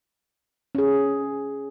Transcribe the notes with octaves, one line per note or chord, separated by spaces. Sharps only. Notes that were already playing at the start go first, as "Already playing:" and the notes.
C#4 G#4